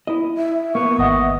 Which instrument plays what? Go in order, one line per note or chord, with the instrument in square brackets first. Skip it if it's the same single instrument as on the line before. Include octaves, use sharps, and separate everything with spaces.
[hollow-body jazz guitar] E4 D#5
[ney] E5
[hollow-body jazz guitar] A#3 B3 [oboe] C#6
[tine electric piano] G#1 F#5 [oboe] D#5